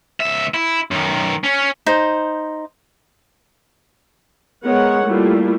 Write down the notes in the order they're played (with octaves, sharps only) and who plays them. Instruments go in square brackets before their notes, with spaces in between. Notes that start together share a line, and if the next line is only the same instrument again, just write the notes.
[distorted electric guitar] C#2 E5
E4
F#2 D#3
C#4
[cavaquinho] D#4 C5
[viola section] G#3 B3 A#4 C#5 F#5
G3 A3 A#3 E4 F4